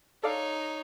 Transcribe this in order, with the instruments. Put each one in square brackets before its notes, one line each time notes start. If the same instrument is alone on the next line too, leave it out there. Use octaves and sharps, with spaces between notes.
[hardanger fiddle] D#4 C#5 [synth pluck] A4 D5 F5